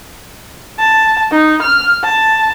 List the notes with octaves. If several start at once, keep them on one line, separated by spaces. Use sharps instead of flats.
A5
D#4
F6
A5